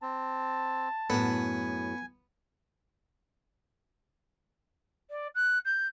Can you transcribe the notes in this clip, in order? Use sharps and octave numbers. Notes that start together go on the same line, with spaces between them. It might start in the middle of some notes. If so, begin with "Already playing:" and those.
C4 A5
F#2 A2 B3 G#5
D5
F#6
G6